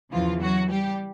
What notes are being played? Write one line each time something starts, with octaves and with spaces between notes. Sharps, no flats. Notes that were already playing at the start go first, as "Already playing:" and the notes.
E2 C#3 E3 F3 F4
F#3 F#4
G3 G4